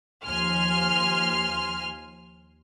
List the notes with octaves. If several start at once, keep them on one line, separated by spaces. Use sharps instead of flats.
D#2 F3 G#5 C6 F6